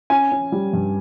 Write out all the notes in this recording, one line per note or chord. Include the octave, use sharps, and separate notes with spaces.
C#4 G#5
C#4
G3
G2